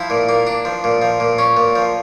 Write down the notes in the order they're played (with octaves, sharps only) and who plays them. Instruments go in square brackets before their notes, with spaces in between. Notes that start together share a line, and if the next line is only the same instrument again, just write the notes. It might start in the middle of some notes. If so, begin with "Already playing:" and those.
Already playing: [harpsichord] F3 E4
A#2
A#3
D4
F3
A#2
F3
A#2
C#4
A#2
F3